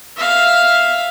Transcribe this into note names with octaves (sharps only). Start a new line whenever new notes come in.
E5 F5